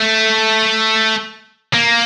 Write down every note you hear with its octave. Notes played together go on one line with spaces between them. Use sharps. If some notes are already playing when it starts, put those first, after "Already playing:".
Already playing: A3
A#3